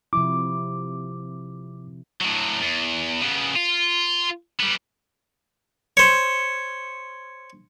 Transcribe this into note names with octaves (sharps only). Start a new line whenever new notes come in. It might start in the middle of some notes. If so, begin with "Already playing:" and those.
C3 F3 E4 D6
A2 F#3
E2
C#3 B3
F4
G3 B3
C5 C#5